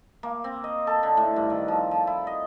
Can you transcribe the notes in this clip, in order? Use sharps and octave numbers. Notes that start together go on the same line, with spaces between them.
A#3
C4
D#5
A4
D3
A2
G2
D#3
F3
F3
E4
D#5